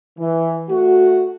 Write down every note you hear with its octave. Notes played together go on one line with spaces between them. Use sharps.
E3
A3 F#4